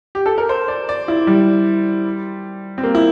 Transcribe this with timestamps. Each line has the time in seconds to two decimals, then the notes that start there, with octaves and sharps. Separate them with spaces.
0.15 G4
0.26 A4
0.38 A#4
0.49 C5
0.68 D5
0.89 D5
1.08 E4
1.27 G3
2.78 C4
2.83 A#3
2.95 E4